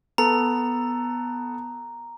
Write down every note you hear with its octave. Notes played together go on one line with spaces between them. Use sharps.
B3 A4 A#5